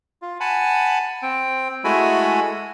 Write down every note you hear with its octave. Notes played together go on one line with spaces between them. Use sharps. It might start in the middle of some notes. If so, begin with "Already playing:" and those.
F4
F#5 G#5 A5 B5
C4 G5
G#3 A3 E4 F#4 G#5 B5